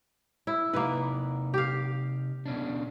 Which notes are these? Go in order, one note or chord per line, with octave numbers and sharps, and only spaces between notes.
E4
C3 A#3 D#4 B4
G4 F5
B2 C#4 D4